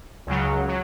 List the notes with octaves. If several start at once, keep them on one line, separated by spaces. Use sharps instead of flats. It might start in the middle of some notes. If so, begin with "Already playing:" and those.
C#2 C#3 F#3
F#3